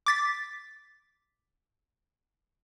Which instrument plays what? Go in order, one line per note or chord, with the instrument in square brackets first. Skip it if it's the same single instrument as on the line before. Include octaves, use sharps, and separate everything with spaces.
[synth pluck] D6 A6 B6